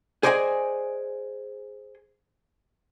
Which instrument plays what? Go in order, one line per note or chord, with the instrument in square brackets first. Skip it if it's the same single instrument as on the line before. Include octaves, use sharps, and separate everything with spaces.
[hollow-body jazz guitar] G#4 C5 D5 D#5 F5 G#5